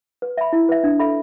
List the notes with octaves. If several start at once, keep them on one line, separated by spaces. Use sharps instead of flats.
B4
E5 B5
E4
B4 E5
D4
A4 E5 B5